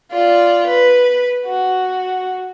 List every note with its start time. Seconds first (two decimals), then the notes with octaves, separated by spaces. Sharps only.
0.11 F4 D5
0.67 B4
1.46 F#4